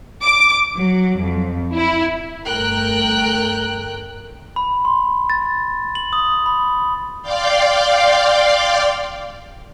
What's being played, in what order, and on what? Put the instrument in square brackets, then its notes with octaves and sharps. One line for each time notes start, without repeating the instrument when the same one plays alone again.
[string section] D6
F#3
F2
E4
G1 A3 A#4 G5 F#6
[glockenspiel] B5
C6
A6
F#7
D#6
B5
[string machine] D5 F5 G5 C6 D6